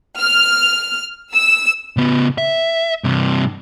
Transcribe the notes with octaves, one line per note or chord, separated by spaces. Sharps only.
F6
E6
C#3 B3
E5
G2 C3